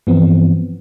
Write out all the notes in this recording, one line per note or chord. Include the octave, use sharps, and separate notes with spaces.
G2 E3 F3 B3 C4